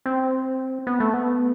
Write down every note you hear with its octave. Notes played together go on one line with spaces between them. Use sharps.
C4
B3
A3
B3